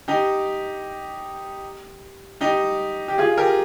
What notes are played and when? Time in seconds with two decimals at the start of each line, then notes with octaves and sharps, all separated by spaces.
0.08 D#4 G4
2.41 D#4 G4
3.08 G4
3.18 F4 G#4
3.38 G4 A#4